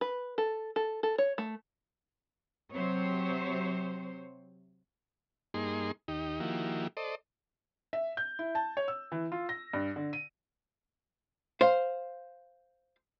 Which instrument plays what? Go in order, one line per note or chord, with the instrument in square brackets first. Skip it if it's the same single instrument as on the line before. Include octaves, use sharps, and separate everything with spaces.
[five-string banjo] B4
A4
A4
A4
C#5
A3
[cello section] C3 F#3 C4 C5 C#5
[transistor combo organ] G2 A#3 D#4 G#4 C6
D#2 D#4 G4
D#3 F3 A#3 E4 F#4 G4
A4 C5 D5 D#5
[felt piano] E5
G6
E4
A5
C#5
E6
E3
F4
A#6
G2
D3
D#7
[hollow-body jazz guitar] C5 F5